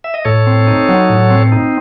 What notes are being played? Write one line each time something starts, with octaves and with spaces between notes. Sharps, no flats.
E5
D#5
A2 A4 C#5
C4
D#4
F#3
A2
C4
D#4